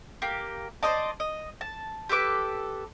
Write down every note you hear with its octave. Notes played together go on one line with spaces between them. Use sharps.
A#3 G4
C5 D5 D#5 A5
D#5
A5
G4 A4 B4 D6